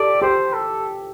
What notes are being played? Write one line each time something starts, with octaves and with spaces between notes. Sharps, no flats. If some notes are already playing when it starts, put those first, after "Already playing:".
Already playing: G4 A4 D5
G4 C5
A4